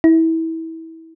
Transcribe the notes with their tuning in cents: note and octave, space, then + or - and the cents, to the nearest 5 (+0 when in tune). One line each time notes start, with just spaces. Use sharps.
E4 -25